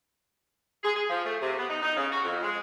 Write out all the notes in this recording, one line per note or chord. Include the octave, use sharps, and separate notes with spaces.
G#4
G#4
F3
A3
C3
B3
D#4
D#4
C#3
F#4
F2
G#3